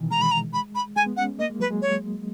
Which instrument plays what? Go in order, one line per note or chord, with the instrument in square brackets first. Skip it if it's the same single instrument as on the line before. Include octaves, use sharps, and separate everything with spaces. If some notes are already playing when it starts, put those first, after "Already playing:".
Already playing: [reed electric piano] B2 D#3 E3
[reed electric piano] G#3 [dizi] A#5
[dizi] B5
A#5
B5
B5
[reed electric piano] G#3 [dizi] G#5
[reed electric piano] B3
[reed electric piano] C#4 [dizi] F#5
[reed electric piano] A#3 [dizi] D#5
[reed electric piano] G#3
[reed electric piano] F#3 [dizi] B4
[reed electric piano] G#3
[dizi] C#5